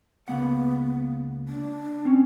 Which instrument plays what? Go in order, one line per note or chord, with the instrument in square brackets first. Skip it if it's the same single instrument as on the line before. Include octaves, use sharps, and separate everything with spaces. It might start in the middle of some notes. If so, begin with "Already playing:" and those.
[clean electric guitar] C#2 A#3 F#5 [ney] B3
[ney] D4
[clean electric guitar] C4 C#4